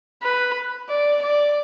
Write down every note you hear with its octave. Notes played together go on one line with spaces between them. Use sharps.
B4
D5
D5